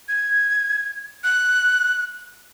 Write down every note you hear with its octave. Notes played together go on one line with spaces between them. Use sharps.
G#6
F#6